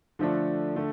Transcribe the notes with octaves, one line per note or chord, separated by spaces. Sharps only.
D3 F3 A3 D4
D3 A3